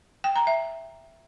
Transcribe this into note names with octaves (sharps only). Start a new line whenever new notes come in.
G5
A#5
E5